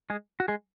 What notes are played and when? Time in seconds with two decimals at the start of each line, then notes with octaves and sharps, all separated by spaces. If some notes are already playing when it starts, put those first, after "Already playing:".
0.10 G#3 G#4
0.40 F#4
0.48 G#3 G#4